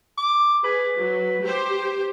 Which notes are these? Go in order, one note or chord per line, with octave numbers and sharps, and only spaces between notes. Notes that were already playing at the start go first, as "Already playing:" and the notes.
D6
G#4 B4
F#3
G4 C5